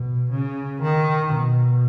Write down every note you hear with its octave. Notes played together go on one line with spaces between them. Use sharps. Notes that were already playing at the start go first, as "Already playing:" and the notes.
Already playing: B2
C#3
D#3
B2